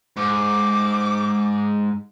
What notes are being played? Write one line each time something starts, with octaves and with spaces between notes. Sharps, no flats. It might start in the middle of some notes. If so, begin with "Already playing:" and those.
G#2 D6